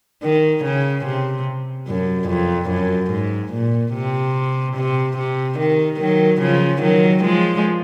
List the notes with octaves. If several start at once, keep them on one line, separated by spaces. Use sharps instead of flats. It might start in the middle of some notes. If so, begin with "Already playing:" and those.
D#3
C#3
C3
F#2
F2
F#2
G#2
A#2
C3
C3
C3
D#3
D#3 F#3
C#3 F3
D#3 F#3
F3 G#3